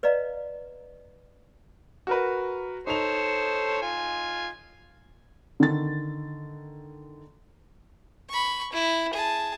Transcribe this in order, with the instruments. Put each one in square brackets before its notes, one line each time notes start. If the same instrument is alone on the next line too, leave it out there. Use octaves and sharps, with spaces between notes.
[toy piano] B4 D5 D#5 F5 A#5
[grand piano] F#4 A#4 B4
[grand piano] D#4 F7 [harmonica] A4 C5 C#5
[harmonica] F4 G#5
[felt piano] D3 D#3 A6
[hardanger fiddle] B5 C#6
E4
G#4 A5